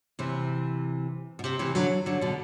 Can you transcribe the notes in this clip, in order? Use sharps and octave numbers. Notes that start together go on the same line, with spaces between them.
C3 E3
B2
C3
C3 E3
D3 F#3
D3 F#3
B2 D3